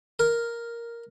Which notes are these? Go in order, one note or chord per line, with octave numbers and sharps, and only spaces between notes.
A#4